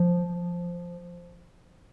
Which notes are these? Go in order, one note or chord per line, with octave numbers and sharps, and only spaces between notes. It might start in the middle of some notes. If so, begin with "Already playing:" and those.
Already playing: F3